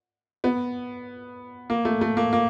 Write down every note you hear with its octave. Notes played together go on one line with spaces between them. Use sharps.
B3
A#3
A3
A3
A#3
A#3